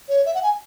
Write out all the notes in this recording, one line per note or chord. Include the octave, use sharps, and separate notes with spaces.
C#5
E5
F#5
G#5